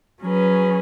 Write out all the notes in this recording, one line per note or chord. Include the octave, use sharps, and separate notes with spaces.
F#3 C#4 G#4 B4